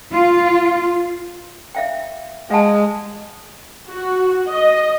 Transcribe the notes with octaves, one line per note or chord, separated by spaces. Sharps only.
F4
E5 F5 G5
G#3 F5 F#5 A5
F#4
D#5